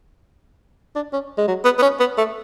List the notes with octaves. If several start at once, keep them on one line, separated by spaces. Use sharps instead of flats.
D4
C#4
G#3
F#3
B3
B3
C#4
B3
A3